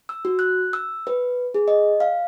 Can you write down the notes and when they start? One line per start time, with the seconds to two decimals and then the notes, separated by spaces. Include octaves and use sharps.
0.09 E6
0.25 F#4
0.39 F#6
0.73 E6
1.07 B4
1.54 G#4
1.68 D#5
2.00 F5